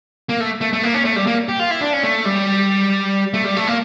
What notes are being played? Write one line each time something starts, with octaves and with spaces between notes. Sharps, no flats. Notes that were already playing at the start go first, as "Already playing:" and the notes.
A#3
A3
A3
A3
A#3
C#4
A3
G3
A#3
G4
F4
E4
D4
C#4
A3
G3
A3
G3
A3
A#3